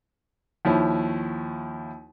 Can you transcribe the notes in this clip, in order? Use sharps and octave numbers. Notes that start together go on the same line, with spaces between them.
D#2 F3 E4 C#5